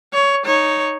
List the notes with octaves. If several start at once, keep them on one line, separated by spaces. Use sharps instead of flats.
C#5
D#4 C#5